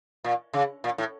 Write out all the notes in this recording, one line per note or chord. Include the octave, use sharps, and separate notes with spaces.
A#2
C#3
A#2
A2